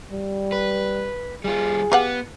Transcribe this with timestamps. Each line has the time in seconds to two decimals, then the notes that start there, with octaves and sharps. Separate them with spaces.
0.11 G3
0.52 B4
1.44 G3 F4 G#4
1.92 B3 G4 F5 F#5